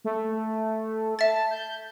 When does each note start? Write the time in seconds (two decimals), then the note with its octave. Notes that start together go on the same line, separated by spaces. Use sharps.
0.04 A3
1.19 E5 A5 A6
1.51 G6